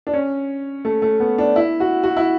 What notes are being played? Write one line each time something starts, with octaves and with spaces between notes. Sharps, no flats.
D4
C#4
A3
A3
B3
D4
E4
F#4
F#4
E4